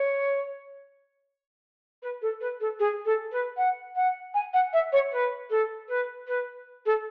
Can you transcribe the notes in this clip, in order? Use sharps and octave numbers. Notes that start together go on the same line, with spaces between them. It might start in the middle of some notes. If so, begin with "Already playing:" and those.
Already playing: C#5
B4
A4
B4
A4
G#4
A4
B4
F#5
F#5
G#5
F#5
E5
C#5
B4
A4
B4
B4
A4